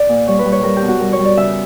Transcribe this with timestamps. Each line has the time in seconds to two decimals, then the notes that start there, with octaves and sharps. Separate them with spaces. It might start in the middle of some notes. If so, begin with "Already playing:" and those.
Already playing: D5
0.09 A#2
0.27 G3 C#5
0.39 B4
0.45 G3
0.52 C#5
0.63 G3 A#4
0.76 G4
0.82 B2
0.88 F#4
1.00 G3 A#4
1.13 C#5
1.19 G3
1.25 D5
1.37 C#3 E5